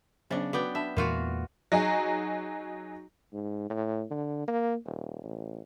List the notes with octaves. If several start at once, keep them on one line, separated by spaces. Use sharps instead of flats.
C#3 F#3 B3 D4 C5
B3 F#4 B4 D5 G5 D6
D4 E5 A5
E2 A#2 E3 G#3 F4 F#4 A#4
F#3 D#4 G#4
G#2
A2
D3
A#3
D#1
A1